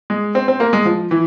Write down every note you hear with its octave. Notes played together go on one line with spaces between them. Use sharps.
G#3
C4
C4
A#3
G#3
F3
E3